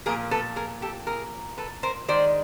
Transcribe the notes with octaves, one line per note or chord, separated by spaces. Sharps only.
A#2 F3 A#3 G#4 A#4
A4 B4
G#4 A#4
G4 A4
G#4 A#4
A4 B4
A#4 C5
D#3 G#3 C5 D5